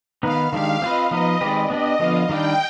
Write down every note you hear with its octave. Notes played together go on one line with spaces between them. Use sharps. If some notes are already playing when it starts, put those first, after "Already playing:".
D#3 B3 D#4 B4 F5
D#3 G#3 D4 G4 F5
C4 F4 B4 D#5
F3 B3 D#4 B4 D#5
D#3 G#3 C4 G4 B4 D5
B3 D4 G4 D#5
D3 F3 B3 F5
D#3 G3 D4 G5